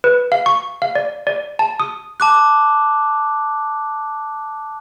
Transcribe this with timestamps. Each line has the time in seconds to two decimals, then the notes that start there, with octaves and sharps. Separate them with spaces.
0.04 B4
0.32 F5
0.46 C#6
0.82 F5
0.95 D5
1.27 D5
1.59 A5
1.80 D#6
2.20 A5 D6 F#6